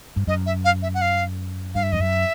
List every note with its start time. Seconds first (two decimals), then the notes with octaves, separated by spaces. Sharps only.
0.16 G2
0.27 F#2 D#5
0.46 E5
0.65 F5
0.82 E5
0.94 F#5
1.02 F5
1.75 G2 F5
1.83 E5
1.92 F2 D#5
2.00 F#2 E5